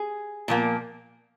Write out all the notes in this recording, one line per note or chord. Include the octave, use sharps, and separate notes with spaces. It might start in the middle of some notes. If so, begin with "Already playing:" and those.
Already playing: G#4
A#2 F3 A#3